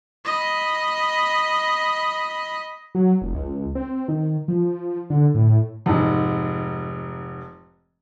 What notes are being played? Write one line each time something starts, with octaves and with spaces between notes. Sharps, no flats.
D#5 B5
F#3
F1
C#2
C4
D#3
F3
D3
A2
F1 G#2